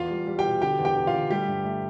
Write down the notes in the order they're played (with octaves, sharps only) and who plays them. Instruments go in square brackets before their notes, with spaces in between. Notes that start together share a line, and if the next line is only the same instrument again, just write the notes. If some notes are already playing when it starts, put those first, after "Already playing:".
Already playing: [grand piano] E2 F4 F5
G3
G3
G4 G5
B2
D3 G4 G5
E2
G4 G5
E2
F4 F5
D3
G3 A3 G4
G2
A3